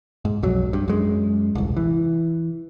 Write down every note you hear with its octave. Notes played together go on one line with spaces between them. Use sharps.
G#2
B1 F2 F#3
G2
F#2 G#3
D#1 C2
E3